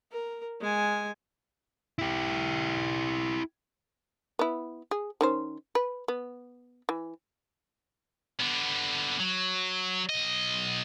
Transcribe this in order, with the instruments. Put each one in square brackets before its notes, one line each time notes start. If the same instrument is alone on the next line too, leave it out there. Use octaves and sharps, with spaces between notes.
[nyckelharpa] A#4
G#3 G#5
[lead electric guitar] E4 G4
[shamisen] B3 E4
G#4
D#3 C#4 C5
B4
B3
E3
[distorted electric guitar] D3 B3
F#3
B1 D#5